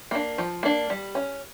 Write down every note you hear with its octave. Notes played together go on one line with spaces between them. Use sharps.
A#3 D4
F3
A#3 D4
G3
C#4